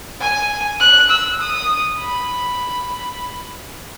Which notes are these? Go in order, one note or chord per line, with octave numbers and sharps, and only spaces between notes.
G#5
F#6
E6
D#6
B5